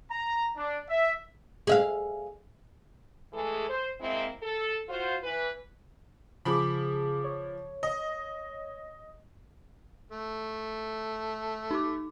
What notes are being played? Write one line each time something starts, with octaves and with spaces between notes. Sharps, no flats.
A#5
D4
E5
G#4 E5 F5
E3 G#3 A3 G#4 A4
C5
G#3 A#3 C4 E4
A4
F4 F#4 C5
E3 B4
C#3 F3 G#4 B5 D6
C#5
D#5
A3
D#4 D6